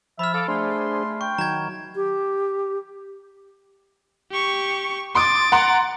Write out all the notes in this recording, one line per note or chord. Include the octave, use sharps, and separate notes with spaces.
F3 E5 B5 F6
A4 F5 D6
A3 D4 G#4 C5 C6
G5 C#6
D#3 F#3 A#5 G#6
G4
G4 C#6
C6 D6 D#6 A6 D7
F#5 A#5 C6